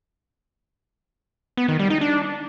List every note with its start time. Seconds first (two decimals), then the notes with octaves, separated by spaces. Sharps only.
1.57 B3
1.68 D#3
1.79 G3
1.90 D#4
2.01 D4